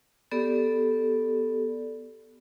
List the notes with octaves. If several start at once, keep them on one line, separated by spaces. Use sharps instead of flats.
B3 G4 A4 D5